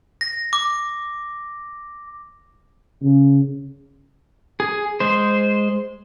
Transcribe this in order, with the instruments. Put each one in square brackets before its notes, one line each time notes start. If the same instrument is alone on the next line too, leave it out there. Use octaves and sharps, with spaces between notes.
[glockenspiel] A#6
D6
[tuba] C#3
[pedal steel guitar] G#4
G#3 C5